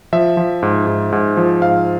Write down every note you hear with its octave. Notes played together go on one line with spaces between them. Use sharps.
F3 E5
F3
G#2
G#2
G#2
F3
G#2 F5